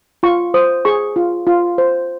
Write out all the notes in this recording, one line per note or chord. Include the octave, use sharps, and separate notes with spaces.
F4 C#6
C5 D#6
G#4 C#6
F4
F4
C5